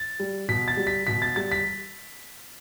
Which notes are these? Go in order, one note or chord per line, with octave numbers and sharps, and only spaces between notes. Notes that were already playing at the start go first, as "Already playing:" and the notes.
Already playing: A6
G3
B2 B6
A6
G3
B6
B2 B6
A6
G3 A6
B6